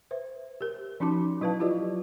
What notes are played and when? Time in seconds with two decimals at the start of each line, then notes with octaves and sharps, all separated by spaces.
0.11 B4 C5 E5
0.61 G4 A#4
1.00 F3 C#4 D#4 F#4 A5 D6
1.41 F#3 E4 B4 F5 A5
1.60 E4 F4 G4 B4 D5 D#5